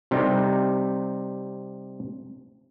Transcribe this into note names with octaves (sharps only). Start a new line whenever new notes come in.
C3 G3 D#4